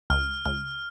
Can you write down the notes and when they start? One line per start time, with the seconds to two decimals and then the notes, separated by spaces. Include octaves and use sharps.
0.10 C#2 F6
0.45 C#2 F6